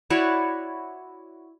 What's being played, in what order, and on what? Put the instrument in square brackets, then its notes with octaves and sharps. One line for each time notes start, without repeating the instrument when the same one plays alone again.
[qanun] E4 F#4 C#5 D5